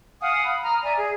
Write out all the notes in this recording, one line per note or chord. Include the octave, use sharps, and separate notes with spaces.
F5 F#5 G#5 D#6
B5
A#5 D#6 F6
D5 E5 G#5 A#5
G#4